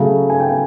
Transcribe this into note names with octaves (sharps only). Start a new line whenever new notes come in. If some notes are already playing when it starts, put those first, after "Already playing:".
Already playing: C#3 F#3 A3
G#5
G5
G#5